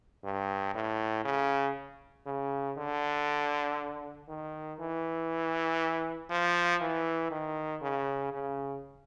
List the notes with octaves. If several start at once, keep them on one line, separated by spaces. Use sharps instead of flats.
G2
A2
C#3
C#3
D3
D#3
E3
F3
E3
D#3
C#3
C#3